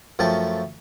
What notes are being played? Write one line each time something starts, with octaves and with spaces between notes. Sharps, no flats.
F#2 F3 A3 G5 A5 C#6